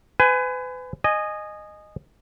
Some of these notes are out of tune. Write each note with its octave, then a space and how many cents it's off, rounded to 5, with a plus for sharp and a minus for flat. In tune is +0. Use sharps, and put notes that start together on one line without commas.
B4 +35 G#5 +0
D#5 -15 G#5 +0